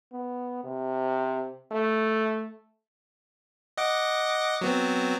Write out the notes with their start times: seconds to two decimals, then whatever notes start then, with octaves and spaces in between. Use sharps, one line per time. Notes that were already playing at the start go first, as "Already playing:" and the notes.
0.12 B3
0.64 C3
1.71 A3
3.77 D#5 F#5 D6
4.61 F#3 B3 C4